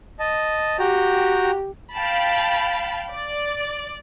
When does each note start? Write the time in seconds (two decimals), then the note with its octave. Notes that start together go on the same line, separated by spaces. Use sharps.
0.19 D#5 A5
0.79 F#4 G4 G5 A#5
1.94 F5 G5 A5 B5
3.11 D5